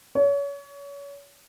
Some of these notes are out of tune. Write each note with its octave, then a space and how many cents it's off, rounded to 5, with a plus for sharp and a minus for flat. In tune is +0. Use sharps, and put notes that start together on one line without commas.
C#5 +30